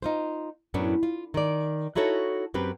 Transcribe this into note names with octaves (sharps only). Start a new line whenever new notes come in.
D#4 F4 C5
F#2 A2 B3 C#4 D4
F4
D#3 D5
D#4 E4 F#4 A4 C#5
F#2 C4 G4 B4